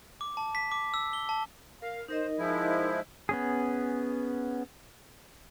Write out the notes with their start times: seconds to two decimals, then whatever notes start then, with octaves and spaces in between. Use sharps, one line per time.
0.21 D6
0.37 A5
0.55 B6
0.72 D6
0.94 E6
1.13 G7
1.29 A5
1.82 A#4 F5
2.08 D#4 A#4 C5 D#5
2.38 F3 G#3 E4
3.29 B3 C#4 G#4